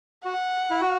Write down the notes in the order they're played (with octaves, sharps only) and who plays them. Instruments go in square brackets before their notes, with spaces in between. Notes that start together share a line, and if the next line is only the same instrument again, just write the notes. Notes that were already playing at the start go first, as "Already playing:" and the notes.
[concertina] F#4 [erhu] F#5
[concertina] E4
F#4